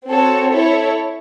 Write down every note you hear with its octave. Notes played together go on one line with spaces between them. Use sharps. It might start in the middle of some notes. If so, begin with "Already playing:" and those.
C4 F#4 A4 C#5
E4 A4 C#5